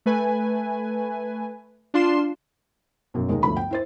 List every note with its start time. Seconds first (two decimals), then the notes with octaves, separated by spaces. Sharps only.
0.06 A3 B4 G#5
1.94 D4 F4 C6 C7 E7
3.14 B1 F#2
3.29 D#2 G#3 D#4
3.43 G1 D2 F3 A3 B5
3.57 G5
3.71 E4 C5 A6